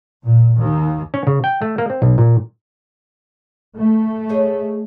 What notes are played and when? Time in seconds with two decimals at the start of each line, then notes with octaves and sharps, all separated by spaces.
0.24 A#2
0.56 D#2
1.14 C#4
1.27 C#3
1.44 G5
1.62 A3
1.78 A#3
1.90 C4
2.02 B1
2.18 A#2
3.75 A3
4.29 G#4 C#5 D#5